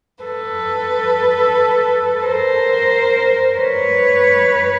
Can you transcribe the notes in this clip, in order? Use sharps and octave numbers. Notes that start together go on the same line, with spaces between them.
A4 B4
A#4 C5
B4 C#5